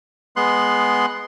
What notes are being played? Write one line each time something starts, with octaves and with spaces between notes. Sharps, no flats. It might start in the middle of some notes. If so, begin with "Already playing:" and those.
G#3 B3 C6 F#6